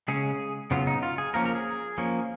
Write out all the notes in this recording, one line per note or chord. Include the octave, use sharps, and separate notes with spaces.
C#3 G#3 C#4 G#4
C#3 F#3 B3 F4
D#4
F4
G#4
F3 A#3 C#4 A#4
A#4
G#4
F3 A#3 C#4